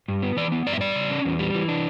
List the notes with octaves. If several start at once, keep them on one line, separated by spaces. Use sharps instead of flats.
G2
B3
E3 D5
B3
G2 D5
E5
G3 D5
C#3
C#4
E2
G3
E3
D4